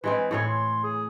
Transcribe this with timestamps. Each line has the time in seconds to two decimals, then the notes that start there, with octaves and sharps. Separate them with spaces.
0.04 E3 G#3 C4 B4
0.31 A2 E3 A4 C#5
0.48 C6
0.83 G#4